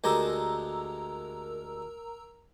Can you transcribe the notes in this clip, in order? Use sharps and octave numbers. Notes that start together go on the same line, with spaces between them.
D2 G#3 G4 A#4 A#5 E6